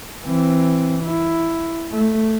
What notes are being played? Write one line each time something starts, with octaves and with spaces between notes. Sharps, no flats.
E3 C4
E4
A3